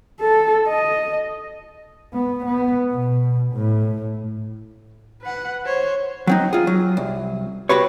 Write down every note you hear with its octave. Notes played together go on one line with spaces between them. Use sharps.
A4
D#5
B3
B3
B2
A2
B4 F#5
C5 C#5
F#3 C4 D#4
F4 G#4
F#3
C2
F#4 G4 B4 C#5